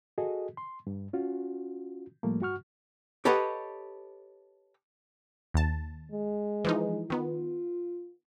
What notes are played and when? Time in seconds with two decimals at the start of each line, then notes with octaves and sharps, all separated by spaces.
0.18 F#4 G#4 A4 D#5
0.57 C6
0.87 G2
1.13 C#4 F4 F#4
2.23 A2 F3 G3 A3 A#3
2.41 G2 F#4 F#5 C#6 F6
3.25 G4 A4 B4 C#5 D#5 F#5
5.54 D#2 A5
6.11 G#3
6.65 E3 F3 D#4
7.10 D#3 B3 F4